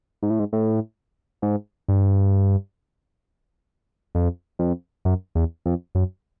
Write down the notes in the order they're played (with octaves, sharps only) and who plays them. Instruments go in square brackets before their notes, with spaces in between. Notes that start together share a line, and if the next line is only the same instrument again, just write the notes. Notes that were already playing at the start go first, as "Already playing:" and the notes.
[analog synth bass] G#2
A2
G#2
A2
G#2
G2
F2
F2
F#2
E2
F2
F#2